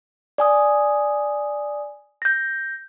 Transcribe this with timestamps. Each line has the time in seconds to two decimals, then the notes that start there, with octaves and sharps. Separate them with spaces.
0.38 D5 G#5 D#6
2.22 G6 A#6